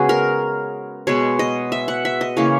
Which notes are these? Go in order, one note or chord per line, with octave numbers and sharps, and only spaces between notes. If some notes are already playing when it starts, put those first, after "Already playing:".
Already playing: C#3 G#3 B3 F#4 G#4
A#4
B2 G#3 B3 C#5
D#5
E5
F#5
E5
D#5
C#3 E3 A#3 C#5